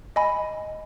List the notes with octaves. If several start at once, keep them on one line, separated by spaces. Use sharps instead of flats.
D#5 G#5 B5